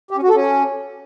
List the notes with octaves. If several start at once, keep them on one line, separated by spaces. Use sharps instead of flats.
G4
C#4
F#4
A4
C#4